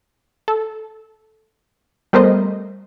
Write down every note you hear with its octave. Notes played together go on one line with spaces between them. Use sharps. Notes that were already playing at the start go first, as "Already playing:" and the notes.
A4
G3 A3 B3 A#4 C5 D#5